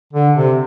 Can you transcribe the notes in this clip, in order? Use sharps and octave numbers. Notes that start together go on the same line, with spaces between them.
D3
C3